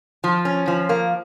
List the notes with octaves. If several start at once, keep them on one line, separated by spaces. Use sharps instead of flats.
F3
C#4
F3
A#3